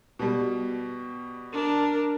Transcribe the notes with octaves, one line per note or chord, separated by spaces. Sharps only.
B2 G3
D4 A#4